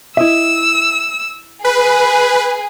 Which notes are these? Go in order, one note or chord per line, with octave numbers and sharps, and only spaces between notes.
E4 D#5 E5 E6
G#4 B4 G#5